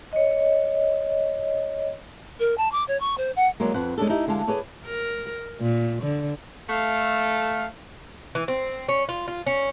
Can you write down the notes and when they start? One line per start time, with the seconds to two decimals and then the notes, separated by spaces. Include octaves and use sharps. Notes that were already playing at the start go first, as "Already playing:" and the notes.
0.13 C#5 D#5
2.39 A#4
2.57 A5
2.72 D6
2.88 C#5
3.00 C#6
3.18 C5
3.36 F#5
3.60 D3 F#3 G#3 A#3
3.74 F2 C4 B4 F#5
3.98 G#3 C#4 D4 A4
4.09 D#4 E4 G4 D#5
4.28 D3 G#3 F5 A5
4.47 G#4 A4 B4 C#5 D5
4.86 A#4
5.61 A#2
6.03 D3
6.70 A3 F5
8.35 E3
8.48 C4
8.88 C#4
9.09 F4
9.28 F4
9.46 C#4